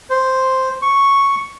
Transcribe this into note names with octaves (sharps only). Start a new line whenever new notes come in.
C5
C#6